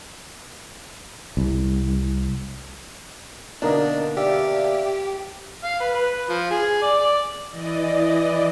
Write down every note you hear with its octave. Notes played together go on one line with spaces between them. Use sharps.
C2
B2 D3 A#3 D4 D#4 A#4 D#5
G4 D5 E5 F5
F5
B4
B4
F3
G#4
D5
D5
E3 D5 D#5